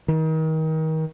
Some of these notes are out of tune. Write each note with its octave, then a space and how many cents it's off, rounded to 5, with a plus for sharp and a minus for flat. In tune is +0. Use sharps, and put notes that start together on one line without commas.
D#3 +30